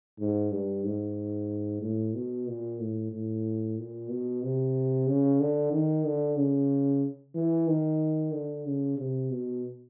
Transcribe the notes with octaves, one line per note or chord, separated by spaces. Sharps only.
G#2
G2
G#2
A2
B2
A#2
A2
A2
A#2
B2
C3
C#3
D3
D#3
D3
C#3
E3
D#3
D3
C#3
C3
B2